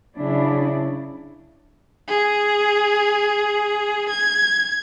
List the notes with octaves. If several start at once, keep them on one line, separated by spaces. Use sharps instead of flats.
C#3 F#3 D4 E4
G#4
G#6